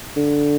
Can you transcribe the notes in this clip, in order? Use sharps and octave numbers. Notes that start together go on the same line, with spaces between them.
D3